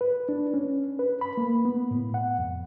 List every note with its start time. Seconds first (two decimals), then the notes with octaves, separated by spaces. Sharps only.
0.01 B4
0.29 D4
0.54 C#4
0.99 B4
1.21 B5
1.37 A#3
1.65 B3
1.91 A2
2.14 F#5
2.39 F2